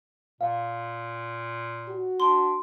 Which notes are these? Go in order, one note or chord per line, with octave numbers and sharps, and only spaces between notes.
A#2 F5
F#4
D4 C6